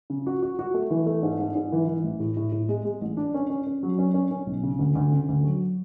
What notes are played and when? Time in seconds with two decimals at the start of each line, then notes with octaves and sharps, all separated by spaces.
0.10 C#3
0.26 F#4
0.43 F#4
0.59 F#4
0.74 A3
0.91 E3
1.06 A3
1.23 G#2
1.39 G#2
1.55 G#2
1.72 E3
1.88 E3
2.04 A1
2.20 A2
2.36 A2
2.52 A2
2.69 G#3
2.85 G#3
3.01 A1
3.17 D4
3.34 C#4
3.50 C#4
3.67 C#4
3.83 F#3
3.99 C#4
4.14 C#4
4.31 C#4
4.47 B1
4.63 C#3
4.79 D2
4.95 D2
5.12 C#3
5.29 D2
5.44 F#3